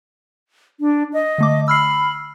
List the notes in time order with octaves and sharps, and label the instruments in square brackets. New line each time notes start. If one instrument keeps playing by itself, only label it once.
[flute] D4
D#5
[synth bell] D3 A3 D6
[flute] B5 [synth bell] E6 F6 C7